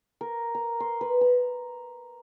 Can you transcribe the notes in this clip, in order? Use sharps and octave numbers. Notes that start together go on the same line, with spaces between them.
A#4
A#5
C6
B4
A#5